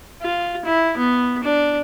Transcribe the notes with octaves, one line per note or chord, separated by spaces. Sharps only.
F4
E4
B3
D4